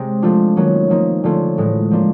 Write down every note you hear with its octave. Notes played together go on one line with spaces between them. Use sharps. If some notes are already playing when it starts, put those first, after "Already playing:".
Already playing: C3 G#3 C4
F3 A3 D4 F4
D#3 F#3 A#3 C#4
F3 A#3 D#4
D3 F3 A3 C#4 F4
A2 E3 G#3
F3 A#3 D4 F4